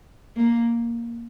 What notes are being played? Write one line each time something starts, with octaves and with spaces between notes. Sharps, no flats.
A#3